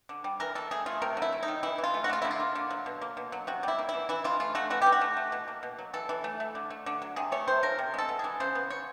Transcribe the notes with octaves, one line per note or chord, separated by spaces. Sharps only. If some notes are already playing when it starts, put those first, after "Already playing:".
D3
G3
E3 A#4
E3 A4
A3 G#4
A3 F4
C3 A#4
F#3
E4
A3
D#4
D#3
E3 E4
E3
F4
A3
F#4
A3 F4
D3 E4
F4
A#3
D3
F#3
B2
A#3
B2
F#3
C3 F#4
G3 E4
A#3
E4
E3
E3 E4
E3 F4
A3 F4
A3 F#4
E3 F#4
E3 G4
F#4
A3
A3
B2
A#3
B2
F#3
E3 A4
E3
A3
A3
D3
A3
D3
F#3
C3 G#4
A3 C#5
C3 C5
F3 A#4
C3
G#3 A4
B3
E3 G#4
C#3 C5
B3
C#3 C#5